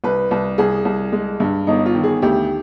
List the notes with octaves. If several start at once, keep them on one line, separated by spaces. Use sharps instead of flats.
C2 B4
C2
C2 G#4
C2
G#3
G2
G1 D#4
F4
D#3
G#4
D2 G4